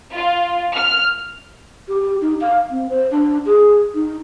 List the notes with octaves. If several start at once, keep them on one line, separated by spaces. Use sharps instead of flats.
F4
F6
G4
D#4
F5
C4
C5
D4
G#4
D#4